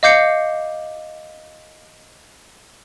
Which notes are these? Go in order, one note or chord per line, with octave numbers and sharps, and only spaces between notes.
D#5 F5 D6 G6 C7 C#7